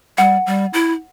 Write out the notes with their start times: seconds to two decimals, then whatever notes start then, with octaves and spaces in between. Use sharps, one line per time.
0.18 G3 F#5
0.46 G3
0.73 E4